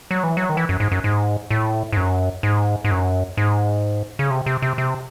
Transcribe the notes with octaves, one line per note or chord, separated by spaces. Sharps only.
F#3
E3
F#3
D#3
E3
F#2
G#2
F#2
G#2
A2
G#2
F#2
G#2
G#2
F#2
G#2
C#3
C3
C3
C3
C3